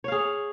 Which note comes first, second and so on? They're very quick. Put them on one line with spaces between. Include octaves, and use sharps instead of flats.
C#5 F5 G#4